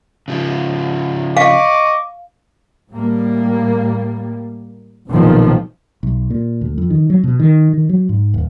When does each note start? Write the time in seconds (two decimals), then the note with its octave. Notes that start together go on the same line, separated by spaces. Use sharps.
0.28 C#3 F3
1.37 D#5 F5 C#6 D6
2.91 A2 G3 A#3
5.09 F1 B1 A#2 D#3 F3
6.03 B1
6.30 A#2
6.61 D2
6.78 F2
6.90 D#3
7.10 F#3
7.24 B2
7.40 D#3
7.74 D#3
7.89 F#3
8.09 G#2
8.34 D#1